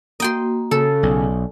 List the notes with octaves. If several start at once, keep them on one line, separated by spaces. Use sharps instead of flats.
A#3 F#4 D#5 G5 C6
C#3 A4
B1 D5 G#5